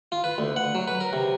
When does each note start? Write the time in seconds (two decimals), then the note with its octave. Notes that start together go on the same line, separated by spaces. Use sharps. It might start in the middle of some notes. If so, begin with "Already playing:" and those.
0.12 F4
0.24 B4
0.38 D2
0.56 F#5
0.75 F#3
0.88 B4
1.00 A#4
1.13 C3